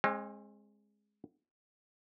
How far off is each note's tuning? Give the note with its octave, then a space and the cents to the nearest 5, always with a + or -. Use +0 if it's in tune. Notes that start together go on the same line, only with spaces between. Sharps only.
G#3 +0 C4 +40